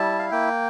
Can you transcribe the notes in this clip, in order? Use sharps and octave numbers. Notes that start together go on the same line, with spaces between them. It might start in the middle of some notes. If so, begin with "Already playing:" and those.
Already playing: G3 E4 A5
F5
A#3 G5